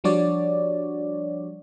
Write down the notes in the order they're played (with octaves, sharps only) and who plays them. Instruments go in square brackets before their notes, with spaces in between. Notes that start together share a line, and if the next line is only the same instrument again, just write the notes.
[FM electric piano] F3 G3 D4 F#4 C#5 D5